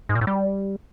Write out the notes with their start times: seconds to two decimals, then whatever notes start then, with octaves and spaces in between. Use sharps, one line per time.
0.09 G#2
0.15 A#2
0.21 A2
0.27 G3